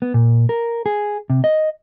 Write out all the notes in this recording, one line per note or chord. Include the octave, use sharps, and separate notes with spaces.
B3
A#2
A#4
G#4
C3
D#5